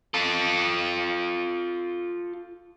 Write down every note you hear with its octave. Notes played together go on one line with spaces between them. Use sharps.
F4 A4